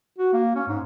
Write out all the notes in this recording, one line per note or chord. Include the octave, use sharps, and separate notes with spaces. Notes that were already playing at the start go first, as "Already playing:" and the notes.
F#4
A#3
C#4
G#2